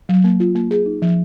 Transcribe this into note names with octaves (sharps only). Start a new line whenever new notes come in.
F#3
A#3
F4
A#3
G#4
D#4
F3